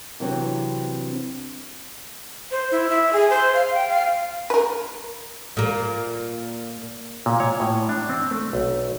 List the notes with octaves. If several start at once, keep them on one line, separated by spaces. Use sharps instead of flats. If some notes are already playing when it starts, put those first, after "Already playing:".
C3 E3 F#3 C4 D4
C5
E4
E5
G#4
C5
F5
G5
F5
A#4 B4
A#2 A#3
A#2
C#5
A2
D4
C4
A3
B1